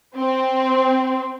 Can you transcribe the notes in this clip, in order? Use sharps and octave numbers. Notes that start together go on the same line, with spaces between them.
C4